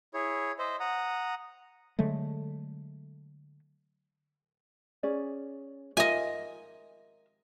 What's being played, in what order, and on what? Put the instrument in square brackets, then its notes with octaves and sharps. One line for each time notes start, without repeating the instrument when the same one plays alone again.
[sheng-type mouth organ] E4 G#4 C#5
C5 D#5 E5
F#5 A#5 D#6
[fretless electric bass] D3 F#3 G#3 A3
[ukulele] C#4 G#4 D5
[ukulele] F4 A#4 E5 [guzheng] D#5 G#5